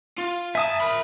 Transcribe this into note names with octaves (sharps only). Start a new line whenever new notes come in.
F4
E5 G#5 A5 D#6
A#4 B5